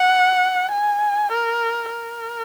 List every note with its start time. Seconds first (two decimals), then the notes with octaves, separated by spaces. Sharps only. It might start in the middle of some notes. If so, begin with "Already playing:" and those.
Already playing: F#5
0.72 G#5
1.32 A#4
1.91 A#4